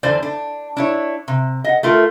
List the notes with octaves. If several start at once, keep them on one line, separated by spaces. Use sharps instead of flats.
E2 D3 C5 D5
D4
D4 E4 C#5
C3
D#5 F#5
A3 F4 A#4